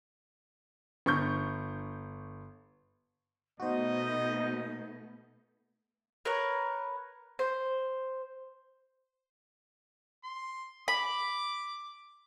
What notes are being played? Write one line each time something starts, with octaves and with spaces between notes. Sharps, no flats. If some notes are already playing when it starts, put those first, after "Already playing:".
G1 C#6 G6
B2 A3 B3 D#4 F#4 C5 D#5
A#4 B4 C#5
C5
C6
B5 D6